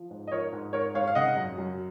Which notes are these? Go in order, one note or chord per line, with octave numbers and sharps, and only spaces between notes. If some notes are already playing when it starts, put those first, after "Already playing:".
Already playing: F3
G#2
D#5
F3 A#4 C#5
G#2
G#2 A#4 C#5
G#2 C#5 F5
F5
C#3 D#5 F#5
F#2
F#2